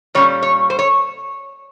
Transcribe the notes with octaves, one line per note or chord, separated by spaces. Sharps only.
A#2 G3 C#4 C#5
C#5
C5
C#5